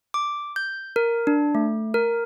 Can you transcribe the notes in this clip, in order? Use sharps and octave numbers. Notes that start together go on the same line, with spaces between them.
D6
G6
A#4
D4
A3
A#4